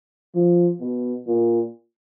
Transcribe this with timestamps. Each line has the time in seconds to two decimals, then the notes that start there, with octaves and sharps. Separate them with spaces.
0.35 F3
0.81 B2
1.27 A#2